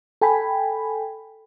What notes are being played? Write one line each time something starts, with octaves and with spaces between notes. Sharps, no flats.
A4 G5 G#5 B5